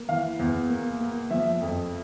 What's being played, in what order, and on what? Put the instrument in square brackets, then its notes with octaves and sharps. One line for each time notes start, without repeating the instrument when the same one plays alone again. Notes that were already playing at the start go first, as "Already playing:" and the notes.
Already playing: [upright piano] A#3
E3 F5
E2
A#3
A#3
F3 E5
F2